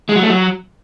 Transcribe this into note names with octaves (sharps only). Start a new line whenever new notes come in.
G#3
F#3
A3
F#3